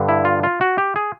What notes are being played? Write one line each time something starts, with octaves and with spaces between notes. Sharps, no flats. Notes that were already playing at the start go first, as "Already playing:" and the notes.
Already playing: G2 D3
E4
F4
F4
F#4
G4
G#4